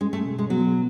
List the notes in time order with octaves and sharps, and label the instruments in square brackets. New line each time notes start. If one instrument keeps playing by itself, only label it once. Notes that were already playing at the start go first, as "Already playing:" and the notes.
[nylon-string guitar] G#3 [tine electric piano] C#4
[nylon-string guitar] A3
[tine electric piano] B2
[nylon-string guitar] G#3
[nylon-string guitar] F#3 [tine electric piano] B3